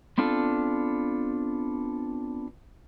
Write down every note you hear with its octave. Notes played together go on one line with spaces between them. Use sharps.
B3 C4 D4 F4 A4